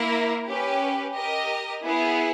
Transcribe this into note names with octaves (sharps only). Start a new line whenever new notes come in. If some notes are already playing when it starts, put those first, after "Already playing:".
Already playing: A#3 E4 A#4
C#4 G4 B4
G4 A#4 D#5
B3 E4 G#4